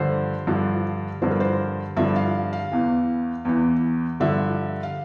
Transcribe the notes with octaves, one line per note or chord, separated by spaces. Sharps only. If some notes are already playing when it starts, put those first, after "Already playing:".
Already playing: G2 D3 F3 C5
G2 D3 F3
G2 D3 F3 C5
A#4
C5
G2 D3 F3 E5
F5
F5
E2 E3
E2 E3
G2 D3 F3 E5
F5